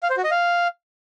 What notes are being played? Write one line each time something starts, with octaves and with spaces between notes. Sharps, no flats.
F5
C5
F#4
D#5
F5